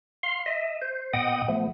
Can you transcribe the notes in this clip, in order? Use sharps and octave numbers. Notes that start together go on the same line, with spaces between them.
F5 C6
D#5 E5
C5
A#2 B3 D#5 F#5 G5 D#6
F3 A3 B3